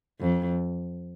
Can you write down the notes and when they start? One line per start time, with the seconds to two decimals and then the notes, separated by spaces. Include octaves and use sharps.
0.20 F2